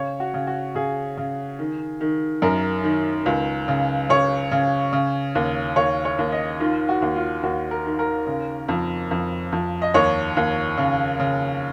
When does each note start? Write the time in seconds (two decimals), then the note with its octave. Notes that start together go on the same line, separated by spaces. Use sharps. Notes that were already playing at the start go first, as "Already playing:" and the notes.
Already playing: C#3 C#5
0.20 F#4
0.34 C#3
0.47 F#4
0.75 C#3 G#4
1.17 C#3
1.59 D#3
2.01 D#3
2.42 F#2 A#4
2.84 D#3
3.26 C#2
3.68 C#3
4.09 C#3 C#5
4.51 C#3
4.93 C#3
5.35 D#2
5.76 D#2 C#5
6.05 C#5
6.19 D#2
6.32 D#5
6.60 D#3 F4
6.89 F#4
7.02 D#2
7.16 F4
7.43 D#2 F#4
7.71 A#4
7.86 D#3
7.99 A#4
8.27 C#3
8.69 F2
9.11 F2
9.52 F2
9.82 D#5
9.94 D#2 C#5
10.37 D#2
10.77 C#3
11.19 C#3